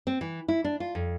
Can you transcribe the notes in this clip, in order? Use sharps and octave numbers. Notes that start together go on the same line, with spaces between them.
C4
E3
E4
D4
F4
F2